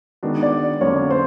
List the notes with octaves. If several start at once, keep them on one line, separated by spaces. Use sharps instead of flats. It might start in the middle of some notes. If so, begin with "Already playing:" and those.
D#3 G#3 B3 D4 F#4
D5
F2 D3 F#3 A#3 C#4 C#5
C5